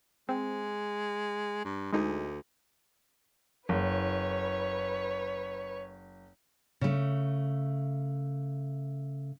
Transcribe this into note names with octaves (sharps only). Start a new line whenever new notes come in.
G#3 C4
G2
D2 G#3 D#4 G#4
F#1 B4 C#5
C#3 A3